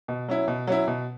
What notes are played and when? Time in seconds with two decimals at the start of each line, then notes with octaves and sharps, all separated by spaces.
0.08 B2
0.29 F#3 C#4 E4
0.48 B2
0.67 F#3 C#4 E4
0.87 B2